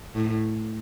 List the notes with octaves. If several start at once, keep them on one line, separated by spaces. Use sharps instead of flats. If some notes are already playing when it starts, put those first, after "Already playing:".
A2